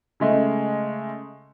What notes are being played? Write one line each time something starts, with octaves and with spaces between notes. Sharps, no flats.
C#3 G#3 A3